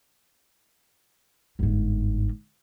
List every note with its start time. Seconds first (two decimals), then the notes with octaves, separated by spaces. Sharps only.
1.59 G1 G#2